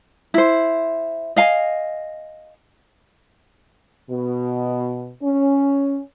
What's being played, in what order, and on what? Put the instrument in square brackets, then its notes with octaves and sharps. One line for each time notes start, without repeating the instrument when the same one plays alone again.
[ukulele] E4 C5
D#5 F5 G#5
[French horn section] B2
C#4